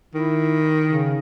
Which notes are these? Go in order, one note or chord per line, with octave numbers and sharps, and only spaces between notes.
D#3 E4
C#3